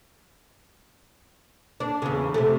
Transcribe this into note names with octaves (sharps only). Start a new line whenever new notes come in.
D4
E2 C#3
C3 A3